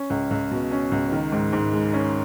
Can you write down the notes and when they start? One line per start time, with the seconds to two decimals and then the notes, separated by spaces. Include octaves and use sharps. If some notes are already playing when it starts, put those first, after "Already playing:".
Already playing: C#4
0.10 C#2
0.31 C#2
0.51 B2
0.72 C#4
0.92 C#2
1.12 D#3
1.32 G#2
1.52 G#2
1.73 G#3
1.93 C#4